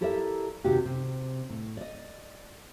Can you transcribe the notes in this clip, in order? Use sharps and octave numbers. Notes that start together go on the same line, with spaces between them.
E4 G4 A4 A#4 D5 E5
D#2 C3 D#4 F#4 G4
C3
A2
D5 D#5